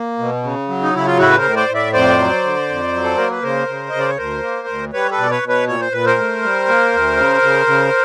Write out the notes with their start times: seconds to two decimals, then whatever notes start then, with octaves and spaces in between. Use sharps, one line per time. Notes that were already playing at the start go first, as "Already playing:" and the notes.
Already playing: A#3
0.19 B2
0.43 C#3
0.68 F#3
0.83 D#4
0.94 C#3 E4
1.06 F4
1.18 A2 E4 F#4
1.29 B4
1.37 A#4 C5
1.44 A2
1.56 C5 D5
1.69 A2
1.74 D5 E5
1.93 F2 C5 D5
2.19 F#3
2.43 D3
2.69 F2
2.93 F#3
3.04 A4
3.17 A#3 A#4
3.30 B4
3.42 C#3 A#4 C5
3.68 C#3
3.89 C#3 D#5
3.99 D5
4.09 C#5
4.17 D2 A#4 C5
4.42 A#3
4.68 D2
4.93 G3 B4 C#5
5.11 A4 B4
5.18 B2 D5
5.31 B4 C#5
5.42 B2
5.48 B4 C#5
5.67 A#2 C#5
5.81 C5
5.92 A#2 B4
6.06 A#4 C5
6.18 A3
6.43 G3
6.68 A#3
6.93 D2
7.17 C#3
7.42 C#3
7.67 C#3